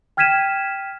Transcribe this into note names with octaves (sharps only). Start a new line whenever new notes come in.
G5 F6 G#6 B6 D#7 E7